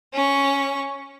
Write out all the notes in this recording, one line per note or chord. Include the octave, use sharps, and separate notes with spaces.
C#4 C#6